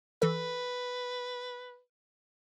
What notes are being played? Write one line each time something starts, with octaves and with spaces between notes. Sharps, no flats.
E3 A4 B4